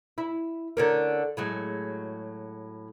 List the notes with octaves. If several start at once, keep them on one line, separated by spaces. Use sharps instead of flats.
E4
D3 C#4 A#4
A2 F#3 G#3